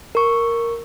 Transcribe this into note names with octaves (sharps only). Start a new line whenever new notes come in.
A#4 C#6